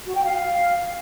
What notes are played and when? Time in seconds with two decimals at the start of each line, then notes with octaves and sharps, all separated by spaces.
0.05 F#4
0.15 G5
0.24 F5